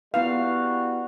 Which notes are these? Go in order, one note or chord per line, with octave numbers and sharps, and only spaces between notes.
G3 B3 E4 F#4 B4 F5